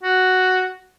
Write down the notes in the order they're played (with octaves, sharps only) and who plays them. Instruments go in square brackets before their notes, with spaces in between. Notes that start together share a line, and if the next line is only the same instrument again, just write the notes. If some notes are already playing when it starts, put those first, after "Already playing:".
[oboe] F#4